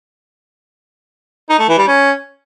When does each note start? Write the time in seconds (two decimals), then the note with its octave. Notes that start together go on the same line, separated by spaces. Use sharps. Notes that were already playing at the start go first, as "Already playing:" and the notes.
1.49 D#4
1.59 A3
1.68 E3
1.78 G3
1.87 C#4